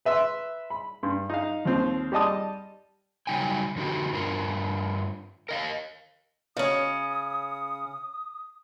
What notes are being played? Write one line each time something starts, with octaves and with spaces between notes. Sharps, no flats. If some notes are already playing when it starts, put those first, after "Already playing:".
B4 E5 C6 E6
B5
G2
D#4 F5
D#2 F3 C4 F4
G3 G4 D#5 A5 D#6
C#3 F#3 G3 D#4 G5 G#5
F2 D3 D#4 F#4 G4
G2 D4 F4 A#4
A#4 D#5 F5
C#3 C#4 C#5 D#5 D#6